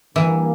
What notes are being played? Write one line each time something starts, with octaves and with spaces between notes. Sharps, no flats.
D3 E3 G3 A#3